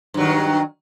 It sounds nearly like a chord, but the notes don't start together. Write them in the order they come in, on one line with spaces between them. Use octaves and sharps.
G2 F#3 D#3